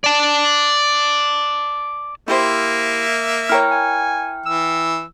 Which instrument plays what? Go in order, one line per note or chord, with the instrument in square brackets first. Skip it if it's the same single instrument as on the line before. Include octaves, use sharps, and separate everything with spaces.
[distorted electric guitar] D5 A5
[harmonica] A#3 E5 [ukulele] E4 G4 C5
[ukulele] E4 A#4 C#5 [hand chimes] G5 F6
[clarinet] G#5
[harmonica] E3 [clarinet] E6